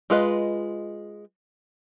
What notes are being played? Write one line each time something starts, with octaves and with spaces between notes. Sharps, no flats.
G#3 F4 B4 D#5